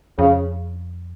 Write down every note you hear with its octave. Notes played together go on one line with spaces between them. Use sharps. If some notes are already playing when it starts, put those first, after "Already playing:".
F2 C#3